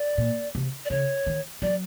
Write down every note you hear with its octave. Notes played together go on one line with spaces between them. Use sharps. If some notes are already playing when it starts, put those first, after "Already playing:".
Already playing: D5
A#2
C3
D5
C#3 C#5
D#3
F#3 D5